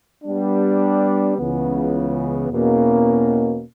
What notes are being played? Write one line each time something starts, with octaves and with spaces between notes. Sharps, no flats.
G3 B3 D4
C#2 C#3 E3 B3
E2 B2 A#3 C#4